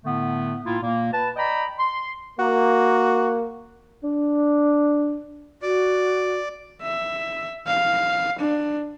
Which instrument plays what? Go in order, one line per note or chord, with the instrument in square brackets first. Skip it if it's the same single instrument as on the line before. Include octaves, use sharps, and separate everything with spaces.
[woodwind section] A2 D3 A3 B3
A2 A#3 E4 F4
A#2 A#3
B4 A5
D5 D#5 G5 A#5 B5
C6
[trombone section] A#3 [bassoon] F#4
[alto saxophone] D4
[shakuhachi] F#4 [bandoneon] D5
[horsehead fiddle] E5
F5
D4